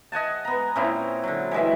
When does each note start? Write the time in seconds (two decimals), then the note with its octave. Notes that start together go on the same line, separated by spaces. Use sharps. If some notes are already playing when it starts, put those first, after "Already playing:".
0.12 D#5 F#5 G#5 A5
0.45 B3 A#5
0.76 A#2 C4 C#4 E4
1.23 D3 F#3
1.51 E3 G3 G#3 E5